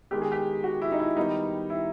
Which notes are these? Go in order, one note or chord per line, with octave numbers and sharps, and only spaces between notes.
D#3 G#3 B3 G4
G#4
G4
F#4
E4
D#4
E4
D#3 G3 B3 D#4
E4